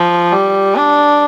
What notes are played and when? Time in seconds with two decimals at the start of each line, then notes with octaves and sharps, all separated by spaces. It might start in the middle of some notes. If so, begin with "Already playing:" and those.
Already playing: F3
0.32 G3
0.76 D4